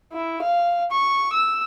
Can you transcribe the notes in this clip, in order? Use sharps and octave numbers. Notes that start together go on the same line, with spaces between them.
E4
F5
C#6
E6